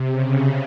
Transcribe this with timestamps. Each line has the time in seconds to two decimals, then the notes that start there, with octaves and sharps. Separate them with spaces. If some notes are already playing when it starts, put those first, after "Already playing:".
Already playing: C3
0.09 C#3